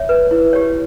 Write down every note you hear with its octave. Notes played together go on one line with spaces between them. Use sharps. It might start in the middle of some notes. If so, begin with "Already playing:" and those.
Already playing: C#5 E5
B4
E4
G4 C#5